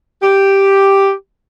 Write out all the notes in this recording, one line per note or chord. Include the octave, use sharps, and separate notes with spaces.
G4